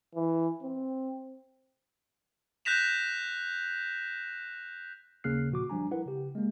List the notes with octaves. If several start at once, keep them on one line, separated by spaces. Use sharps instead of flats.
E3
C4
F#6 G6 A#6 B6 E7 F7
D#2 C#3 A#3 F6 F#6 C7
A#2 F3 F#4 D6
G1 F3 G3 D4 G#5 A#5
E4 A#4 B4 F#5
C#3 G4
G#3 A#3